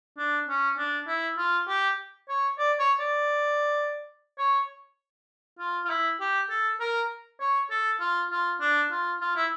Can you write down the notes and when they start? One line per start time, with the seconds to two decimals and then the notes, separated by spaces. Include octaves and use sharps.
0.17 D4
0.48 C#4
0.78 D4
1.07 E4
1.37 F4
1.68 G4
2.29 C#5
2.58 D5
2.79 C#5
2.99 D5
4.38 C#5
5.59 F4
5.85 F4
5.89 E4
6.20 G4
6.49 A4
6.80 A#4
7.40 C#5
7.70 A4
8.00 F4
8.31 F4
8.60 D4
8.91 F4
9.21 F4
9.35 E4